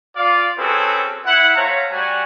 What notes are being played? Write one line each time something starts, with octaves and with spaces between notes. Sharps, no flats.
F4 D5 F5
C4 C#4 F#4 G#4 A4 B4
E4 F#5
A3 C5 C#5 F5 F#5 A#5
G3 F#4 F#5 G#5